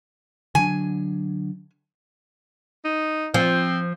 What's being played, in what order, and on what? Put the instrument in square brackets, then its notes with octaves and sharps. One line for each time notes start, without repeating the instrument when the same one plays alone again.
[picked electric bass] D3 F#3 D4 [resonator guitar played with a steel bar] G#5
[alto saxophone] D#4
[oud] F3 [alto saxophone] C4